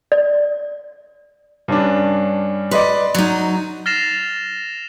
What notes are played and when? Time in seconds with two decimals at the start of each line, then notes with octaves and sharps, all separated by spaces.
0.12 D5
1.68 G2 C#4 D4
2.71 B4 D5 D#5 C6
3.15 F#3 D#4
3.86 F6 A6 A#6 C7 E7 F7